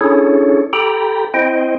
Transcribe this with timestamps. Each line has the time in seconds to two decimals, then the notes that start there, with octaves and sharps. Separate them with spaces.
0.01 C#4 D4 E4 G#4 A4 C#5
0.73 G4 A4 G5 A#5 B5
1.34 C4 E4 C5 D#5 G5